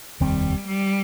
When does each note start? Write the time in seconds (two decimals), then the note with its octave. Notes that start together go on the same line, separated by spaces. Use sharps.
0.20 F1 D#2 D#3 G3 C4
0.67 G3